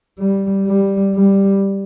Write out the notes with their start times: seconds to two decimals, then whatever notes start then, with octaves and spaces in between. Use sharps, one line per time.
0.19 G3
0.67 G3
1.15 G3